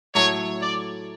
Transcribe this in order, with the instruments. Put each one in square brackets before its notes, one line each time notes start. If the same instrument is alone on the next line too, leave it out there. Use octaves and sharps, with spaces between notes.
[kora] A2 F#3 A3 [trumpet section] C#5
[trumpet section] D5